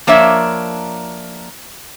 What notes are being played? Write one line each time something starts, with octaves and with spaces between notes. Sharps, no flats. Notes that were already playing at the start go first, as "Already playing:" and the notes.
F3 A#3 D4 C#5 E5